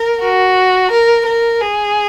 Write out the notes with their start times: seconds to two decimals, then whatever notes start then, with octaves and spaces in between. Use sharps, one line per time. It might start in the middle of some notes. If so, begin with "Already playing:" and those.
Already playing: A#4
0.22 F#4
0.91 A#4
1.26 A#4
1.61 G#4